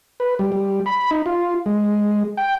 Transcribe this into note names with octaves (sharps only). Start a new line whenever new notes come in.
B4
G3
G3
B5
D#4
F4
G#3
G5